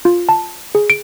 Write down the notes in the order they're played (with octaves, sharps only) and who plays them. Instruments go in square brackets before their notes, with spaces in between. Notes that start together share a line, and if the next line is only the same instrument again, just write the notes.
[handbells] F4
A5
G#4
D7